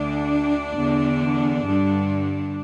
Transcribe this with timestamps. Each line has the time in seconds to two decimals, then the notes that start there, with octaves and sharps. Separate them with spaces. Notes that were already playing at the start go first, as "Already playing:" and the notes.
Already playing: D2 D3 D4
0.78 E2 D3
1.65 G2 D3